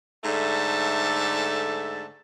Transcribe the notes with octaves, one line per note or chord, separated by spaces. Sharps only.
G#2 D3 A3 E5 A5